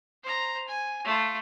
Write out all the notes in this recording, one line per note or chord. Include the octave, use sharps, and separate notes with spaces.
C5 A#5
G#5
A3 F4